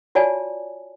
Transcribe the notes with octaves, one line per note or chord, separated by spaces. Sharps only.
F4 F#4 C#5 D5 G#5 A5